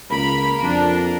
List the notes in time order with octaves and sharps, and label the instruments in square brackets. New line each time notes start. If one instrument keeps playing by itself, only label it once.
[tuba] C#2 [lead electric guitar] A#3 A#4 [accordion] B5
[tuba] F2 [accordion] D4